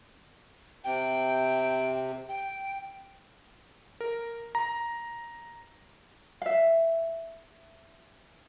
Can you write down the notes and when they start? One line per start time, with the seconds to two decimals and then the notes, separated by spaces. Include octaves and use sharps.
0.84 C3 G5
2.29 G5
4.01 A#4
4.55 A#5
6.42 E5 F5